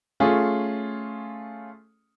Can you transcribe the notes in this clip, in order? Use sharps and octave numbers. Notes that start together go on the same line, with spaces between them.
A3 C#4 F4 G#4